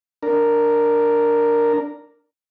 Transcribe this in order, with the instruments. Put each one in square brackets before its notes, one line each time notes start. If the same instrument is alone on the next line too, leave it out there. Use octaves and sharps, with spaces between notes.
[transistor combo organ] D4 A#4